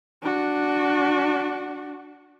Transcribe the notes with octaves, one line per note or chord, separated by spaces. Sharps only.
D4 F#4